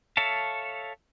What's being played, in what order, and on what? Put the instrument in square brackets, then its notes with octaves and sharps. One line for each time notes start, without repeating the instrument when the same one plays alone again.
[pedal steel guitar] A4 C#5 E5 F5 A5